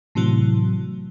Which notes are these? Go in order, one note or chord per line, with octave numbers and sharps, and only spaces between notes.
A2 C3 E3 F#3